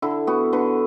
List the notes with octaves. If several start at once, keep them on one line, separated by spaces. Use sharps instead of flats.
D3 E4
B3 F#4
D3 B4